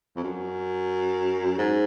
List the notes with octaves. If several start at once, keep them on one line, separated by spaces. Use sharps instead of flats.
F2
F#2
G#2